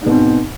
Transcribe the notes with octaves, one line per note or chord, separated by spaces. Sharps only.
G#2 B2 C4